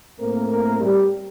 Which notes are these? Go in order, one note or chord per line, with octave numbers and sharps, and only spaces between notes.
A2 A3 A#3 C4 A#4
A#3 A#4
G3 G4